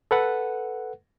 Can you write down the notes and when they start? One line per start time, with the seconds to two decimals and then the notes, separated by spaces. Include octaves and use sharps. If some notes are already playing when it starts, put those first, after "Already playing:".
0.11 A4 B4 F#5